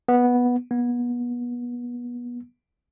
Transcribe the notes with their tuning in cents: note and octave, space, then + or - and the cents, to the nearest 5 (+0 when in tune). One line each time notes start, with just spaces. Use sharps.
B3 -10
B3 -30